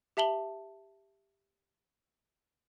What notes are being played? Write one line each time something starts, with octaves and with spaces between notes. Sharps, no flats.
G4 E5 A5 F#7 G7